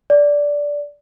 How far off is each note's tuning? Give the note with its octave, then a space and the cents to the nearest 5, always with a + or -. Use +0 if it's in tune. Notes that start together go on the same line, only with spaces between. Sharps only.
D5 -10